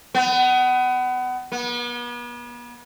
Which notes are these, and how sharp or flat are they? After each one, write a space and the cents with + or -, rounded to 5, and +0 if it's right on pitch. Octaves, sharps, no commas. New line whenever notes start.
B3 +25
B3 -40